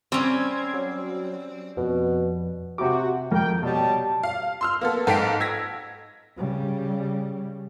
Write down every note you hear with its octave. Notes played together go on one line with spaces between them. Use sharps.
G3 C4 C#4 G#6
F#3
F2 B2
C3 F#4 G4 D6
F2 A#4 G5
B2 F#3 G3 A5
F5
C6 E6 F6
A#3 B3 A4
G#2 A4 F5 G5 B6 D7
E6 G#6 A#6 B6
C#3 G3